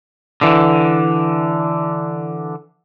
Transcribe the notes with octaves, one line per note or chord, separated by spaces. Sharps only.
D3 E3